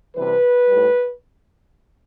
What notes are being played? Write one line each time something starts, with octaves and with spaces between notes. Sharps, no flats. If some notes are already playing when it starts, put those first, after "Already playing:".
C3 E3 G3 B4
A2 G3